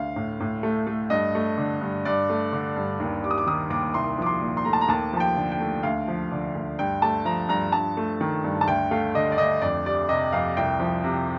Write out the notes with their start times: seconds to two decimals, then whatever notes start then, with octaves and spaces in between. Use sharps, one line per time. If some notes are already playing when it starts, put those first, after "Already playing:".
Already playing: D2 F5
0.16 A2
0.40 A2
0.63 A3
0.87 A3
1.10 G2 D#5
1.35 A3
1.58 D3
1.81 G2
2.05 G2 D5
2.30 A3
2.53 D3
2.76 G2
3.00 D#2
3.23 G3 D6
3.31 D#6
3.38 D6
3.47 D#3 D#6
3.70 D#2 D6
3.94 C2 C6
4.18 F3 D6
4.26 C6
4.41 A#2
4.57 C6
4.65 A3 A#5
4.73 A5
4.81 A#5
4.88 D#2 A5
5.13 F3 A5
5.20 G5
5.36 D3
5.52 G5
5.60 A3
5.83 D2 F5
6.08 F3
6.32 D3
6.55 D2
6.79 G2 G5
7.02 A3 A5
7.25 F3 A#5
7.49 G2 A#5
7.72 G2 A5
7.97 A3
8.21 D#3
8.44 G2
8.61 A5
8.68 D2 G5
8.91 A3 F5
9.15 D3 D#5
9.32 D5
9.38 D2 D#5
9.61 F2 D5
9.86 G3 D5
10.09 C3 D#5
10.32 F2 F5
10.57 C2 G5
10.80 F3
11.04 C3